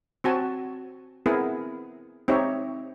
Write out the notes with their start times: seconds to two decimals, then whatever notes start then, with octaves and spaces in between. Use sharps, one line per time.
0.24 C4 F#4 G#5 A5
1.26 B3 C4 E4 G#4 A#4
2.28 C4 D#4 G4 C#5 E5